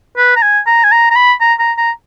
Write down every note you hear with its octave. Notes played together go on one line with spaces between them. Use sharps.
B4
A#5
G#5
A#5
G#5
A#5
A#5
B5
A#5
A#5
A#5